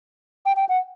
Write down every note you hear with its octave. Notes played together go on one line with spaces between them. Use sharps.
G5
G5
F#5